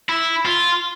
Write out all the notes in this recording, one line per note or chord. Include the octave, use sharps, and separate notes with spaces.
E4
F4